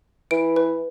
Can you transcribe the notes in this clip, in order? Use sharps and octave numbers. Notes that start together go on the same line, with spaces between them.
E3 D7
B4